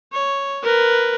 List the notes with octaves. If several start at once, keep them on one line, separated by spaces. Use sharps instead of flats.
C#5
A#4 B4